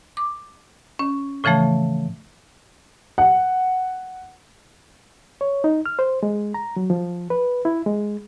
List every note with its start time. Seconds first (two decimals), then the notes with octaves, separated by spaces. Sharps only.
0.17 D6
0.99 C#4
1.44 A2 C#3 E3 F3 A3
3.18 F#5
5.41 C#5
5.64 D#4
5.86 F6
5.99 C5
6.23 G#3
6.54 A#5
6.76 F#3
6.90 F3
7.30 B4
7.65 E4
7.86 G#3